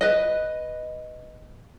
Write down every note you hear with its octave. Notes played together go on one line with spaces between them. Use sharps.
B4 D#5